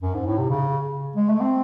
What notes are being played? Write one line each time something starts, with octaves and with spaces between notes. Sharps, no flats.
F#2
G#2
A2
C3
C#3
G#3
A3
C4